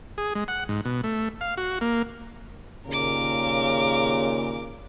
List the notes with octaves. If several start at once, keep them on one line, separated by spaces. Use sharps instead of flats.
G#4
G#3
F#5
G#2
B2
A3
F5
F#4
A#3
D#2 A#2 C#3 A#4 D6